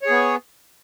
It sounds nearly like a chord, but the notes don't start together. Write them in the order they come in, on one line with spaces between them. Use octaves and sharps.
C#5 G#4 B3